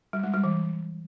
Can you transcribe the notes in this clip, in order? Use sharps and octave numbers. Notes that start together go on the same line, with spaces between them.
G3
G#3
G3
E3